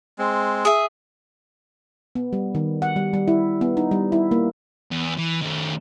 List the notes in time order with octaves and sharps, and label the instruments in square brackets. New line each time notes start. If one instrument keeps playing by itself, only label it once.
[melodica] G#3 C4
[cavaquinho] G#4 E5
[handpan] B3
G3
D#3
F#5
G3
G3
E4
B3
D#4
G3
E4
A#3
[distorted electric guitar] E2
E3
D#3 A3